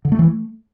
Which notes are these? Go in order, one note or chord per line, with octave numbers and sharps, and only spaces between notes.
D3
A3
E3
A3